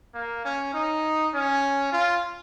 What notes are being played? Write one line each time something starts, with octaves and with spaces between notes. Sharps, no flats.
A#3
C#4
D#4
C#4
F4